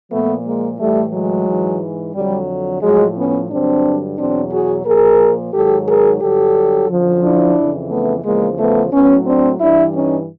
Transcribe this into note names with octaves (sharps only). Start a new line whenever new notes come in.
A#2 F3 A3 B3
G#3 A#3
A2 E3 G3 A3
F#3 G#3
G#2 E3
F2 D3 F#3 G3
A2 F3 F#3 G#3
B3 C#4
G2 D3 F#3 C4 D4
E2 B2 F#3 C4 D4
F#4 G#4
A#2 F3 G#4 A#4
G#2 D#3 F#3 G4 A4
G#4 A#4
G2 D3 F#3 G4 A4
F#2 D3 F3
D4 E4
F2 C#3 E3
A3 B3
E2 C#3 F3 G#3 A#3
A3 B3
A2 F#3 B3 C#4
C4 D4
G2 E3 D4 E4
C#4 D#4